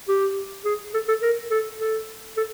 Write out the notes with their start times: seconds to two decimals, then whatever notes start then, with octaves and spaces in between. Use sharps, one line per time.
0.08 G4
0.65 G#4
0.94 A4
1.08 A4
1.22 A#4
1.51 A4
1.80 A4
2.37 A4